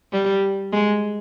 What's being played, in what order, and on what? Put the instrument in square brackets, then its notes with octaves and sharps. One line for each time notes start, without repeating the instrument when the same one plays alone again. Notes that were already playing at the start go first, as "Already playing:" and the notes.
[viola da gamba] G3
G#3